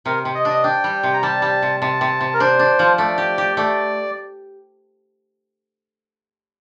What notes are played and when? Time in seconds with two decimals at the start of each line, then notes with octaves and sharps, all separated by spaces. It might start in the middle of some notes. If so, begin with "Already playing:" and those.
0.06 C3 A#4
0.25 C3
0.35 D#5
0.45 D4 D#5
0.64 D4 G5
0.84 G3
1.03 C3
1.14 A#5
1.23 G3 A5
1.42 G3
1.62 C3
1.81 C3 A5
2.01 C3
2.21 C3
2.34 A#4
2.40 D4 C5
2.59 D4
2.79 F3
2.98 A3 D5
3.18 G4
3.38 G4
3.57 A3 D5